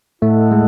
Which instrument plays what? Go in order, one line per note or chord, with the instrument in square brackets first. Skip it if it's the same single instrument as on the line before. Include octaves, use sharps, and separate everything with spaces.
[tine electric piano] A2 A3 [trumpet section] E4 A4 D#5 F#5
[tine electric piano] G#3